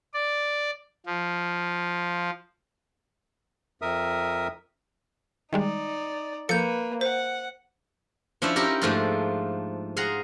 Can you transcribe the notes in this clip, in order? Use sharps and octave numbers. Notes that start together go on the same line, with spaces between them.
D5
F3
F2 A#4 E5 D#6
D#3 G3 G#3 D#4 D5
F3 A#3 A4 B4 G6 C#7
C5 F#5
F3 C#4 D4 E4 C5 C#5
C#4 D#4 E4 G4 A#4
G#2 F3 A3 A#3 D4 F4
G#4 F5 F#5 A#5 C6